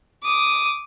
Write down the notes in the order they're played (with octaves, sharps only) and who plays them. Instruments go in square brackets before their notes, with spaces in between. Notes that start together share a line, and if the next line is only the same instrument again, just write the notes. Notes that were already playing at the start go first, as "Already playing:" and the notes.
[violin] D6 D#6